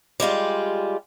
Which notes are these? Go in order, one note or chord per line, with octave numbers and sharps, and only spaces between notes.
G3 G#3 F4 G4